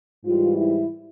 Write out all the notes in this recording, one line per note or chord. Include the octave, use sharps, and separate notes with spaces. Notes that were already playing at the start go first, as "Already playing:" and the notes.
G#2 E3 G3 F4
E4